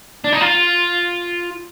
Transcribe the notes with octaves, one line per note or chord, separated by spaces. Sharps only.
D4
D#4
F4